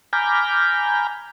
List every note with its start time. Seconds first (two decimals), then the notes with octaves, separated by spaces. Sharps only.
0.13 G#5 A#5 B5 D6 F6 G6